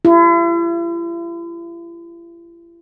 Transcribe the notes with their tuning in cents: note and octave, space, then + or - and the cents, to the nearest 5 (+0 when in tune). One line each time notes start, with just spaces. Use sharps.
E4 +45 G4 +5